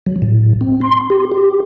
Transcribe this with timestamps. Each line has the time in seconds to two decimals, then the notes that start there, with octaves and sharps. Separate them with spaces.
0.06 F#3
0.22 A2
0.61 C4
0.81 C6
1.10 G4
1.31 G4